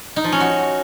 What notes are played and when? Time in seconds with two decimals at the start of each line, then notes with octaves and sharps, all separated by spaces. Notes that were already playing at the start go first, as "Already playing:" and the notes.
0.16 D#4
0.24 F3
0.32 C#4
0.40 F#4